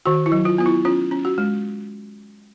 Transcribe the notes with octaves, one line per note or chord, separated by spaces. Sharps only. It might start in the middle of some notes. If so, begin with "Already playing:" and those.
D#3 F#4
E4
F#3
F4
B3 F4
E4
C#4 F4
C#4
F#4
G#3